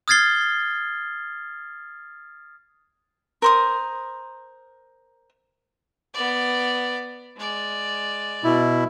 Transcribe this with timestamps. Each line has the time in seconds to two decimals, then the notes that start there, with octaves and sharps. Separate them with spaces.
0.08 D#6 F6 G#6 A6 C7 G7
3.42 A#4 C5 D#6
6.14 B3 D5
7.37 G#3 D5
8.44 B2 E4